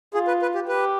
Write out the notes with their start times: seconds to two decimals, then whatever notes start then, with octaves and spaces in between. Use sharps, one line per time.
0.14 F4 G#4
0.28 B4
0.42 B4
0.55 G4
0.68 G4 B4